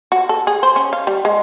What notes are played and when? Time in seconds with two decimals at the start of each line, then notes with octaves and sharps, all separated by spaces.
0.12 F#4
0.29 A4
0.47 G#4
0.63 C5
0.76 C#4
0.93 F5
1.07 G3
1.25 G#3